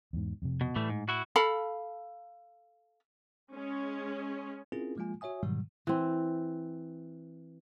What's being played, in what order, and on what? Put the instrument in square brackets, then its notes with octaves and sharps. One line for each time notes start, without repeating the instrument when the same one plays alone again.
[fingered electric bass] E2 G#2
F2 C3
[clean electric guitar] B2
[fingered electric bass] A2 [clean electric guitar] E3 G3 A3
[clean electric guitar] G#2
E4 F#4
[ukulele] A4 F5 B5
[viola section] G#3 C#4
[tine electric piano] C4 C#4 E4 F4 G#4 A#4
F3 G#3 A#3 F4 G#5
F#4 C#5 E5 G#5 D#6
G#2 B2 D3 D#3 F#3 G3
[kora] E3 C4